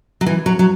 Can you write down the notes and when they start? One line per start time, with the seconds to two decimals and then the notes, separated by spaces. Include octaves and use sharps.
0.21 F#3
0.26 E3
0.46 F#3
0.59 F#3